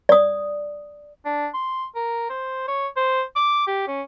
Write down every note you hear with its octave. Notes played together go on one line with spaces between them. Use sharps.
D5 D#6
D4
C6
A#4
C5
C#5
C5
D6
G4
C#4